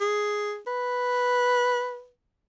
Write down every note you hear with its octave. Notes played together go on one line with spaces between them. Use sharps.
G#4
B4